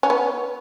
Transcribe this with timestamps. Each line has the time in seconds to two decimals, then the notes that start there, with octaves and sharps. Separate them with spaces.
0.03 C#4
0.10 B3